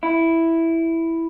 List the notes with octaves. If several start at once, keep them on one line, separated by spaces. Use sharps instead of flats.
E4